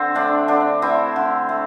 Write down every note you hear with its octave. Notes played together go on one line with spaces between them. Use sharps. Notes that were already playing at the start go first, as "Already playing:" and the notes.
Already playing: D3 C4
A3 D4
D3 D4
A3 C4 E4
D3
A3